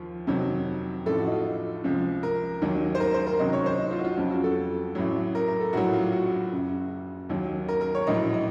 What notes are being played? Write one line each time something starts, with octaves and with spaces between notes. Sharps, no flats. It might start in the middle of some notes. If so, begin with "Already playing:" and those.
Already playing: D#2 F3 F4
F2 C3 D#3 F#3
A1 A2 F3 A4
F#4
D#4
F4
C#2 C3 F3
A#4
D#2 D#3 F#3
C5
A#4
C5
A#4
C#2 C3 D#3 F#3 D#5
C#5
C5
D#4
F4
F#4
F4
F2 C#3 F#3 F4
F#4
A4
A1 A2 F#3
A#4
A#4
A4
A#1 A2 F#3 F#4
F4
F#4
F#1 F#2 C#3
D#2 D#3 F#3
A#4
A#4
C#5
A#1 A2 F#3 D#5
D#5